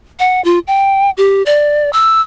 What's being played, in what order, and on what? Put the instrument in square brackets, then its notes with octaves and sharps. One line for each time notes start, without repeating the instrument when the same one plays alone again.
[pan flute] F#5
F4
G5
G4
D5
E6